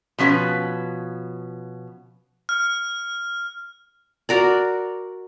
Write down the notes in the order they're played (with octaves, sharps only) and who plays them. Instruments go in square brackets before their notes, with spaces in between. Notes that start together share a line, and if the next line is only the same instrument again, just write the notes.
[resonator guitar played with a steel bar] B2 F3 C#4 B4
[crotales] F6
[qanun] F#4 A#4 D5